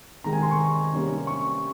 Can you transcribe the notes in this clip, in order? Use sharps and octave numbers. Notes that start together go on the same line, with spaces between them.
C3 D#3 G#3 C4 A#5
G#5
C6
C#6
C3 G3 A#3 C#4
C#6